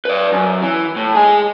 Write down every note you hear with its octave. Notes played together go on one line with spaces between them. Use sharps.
B4 D5
F#2
E3
A2
G#3 G#4